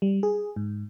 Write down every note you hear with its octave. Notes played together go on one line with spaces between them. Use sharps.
G3
G#4
G#2